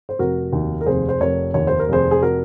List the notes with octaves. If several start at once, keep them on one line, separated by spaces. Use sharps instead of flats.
C5
F1 F#4 A#4
D#2
A#4
F1 G#4 C5
C5
F1 A#4 C#5
D#2 C#5
C5
A#4
F1 G#4 C5
G#4
F#4 A#4